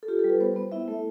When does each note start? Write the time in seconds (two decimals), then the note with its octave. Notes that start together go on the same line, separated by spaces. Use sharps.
0.03 A4
0.08 F4 G4
0.19 A4
0.24 G3
0.30 B4
0.40 B3 C5
0.56 B3
0.72 E4 E5
0.88 A3 A4